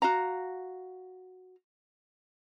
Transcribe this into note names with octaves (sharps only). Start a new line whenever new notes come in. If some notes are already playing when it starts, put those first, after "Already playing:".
F#4 F5 A#5